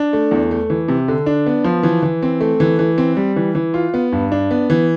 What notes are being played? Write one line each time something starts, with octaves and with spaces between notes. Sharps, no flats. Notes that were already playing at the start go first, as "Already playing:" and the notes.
Already playing: D4
A3
E2
A3
E3
C3
D3
D4
B3
F3
E3
E3
C4
A3
E3
E3
C4
G3
E3
E3
F4
B3
G2
D4
B3
E3